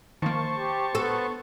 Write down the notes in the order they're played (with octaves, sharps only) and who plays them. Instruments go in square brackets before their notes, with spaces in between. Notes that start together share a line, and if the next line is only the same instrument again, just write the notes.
[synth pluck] D#3 F3 A#3 [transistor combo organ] C5 A5 C#6
[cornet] G4
[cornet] B3 [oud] A4